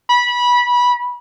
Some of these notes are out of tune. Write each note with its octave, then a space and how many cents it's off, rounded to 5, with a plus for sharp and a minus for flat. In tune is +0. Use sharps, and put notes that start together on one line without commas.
B5 -20